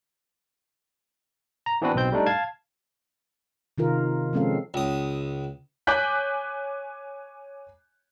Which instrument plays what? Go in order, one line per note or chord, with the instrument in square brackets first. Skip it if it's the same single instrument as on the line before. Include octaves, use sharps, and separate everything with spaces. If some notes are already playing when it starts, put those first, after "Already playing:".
[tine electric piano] A#5
E3 B3 C4 D4 F#4 B4
B1 B2 C4 G6
G3 A3 D4 D#4
F5 A5 G#6
[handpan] C3 D#3 F4 A#4
F3 G#3 C4 C#4 A4 F5
[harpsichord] C#2 D#6
[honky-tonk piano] C#5 G#5 D6 F#6 G6 B6